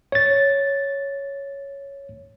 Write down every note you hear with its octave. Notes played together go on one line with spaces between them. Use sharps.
C#5 A6